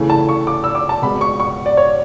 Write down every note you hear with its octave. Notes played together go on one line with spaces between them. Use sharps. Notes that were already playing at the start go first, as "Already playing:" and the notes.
Already playing: C#3 E3 A3
A5
C#6
D6
E6
D6
A5
B2 G#3 B3 B5
C#6
C#6
D5
C#5